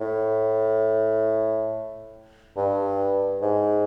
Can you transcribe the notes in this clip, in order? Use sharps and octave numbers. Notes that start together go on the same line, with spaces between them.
A2
G2
G#2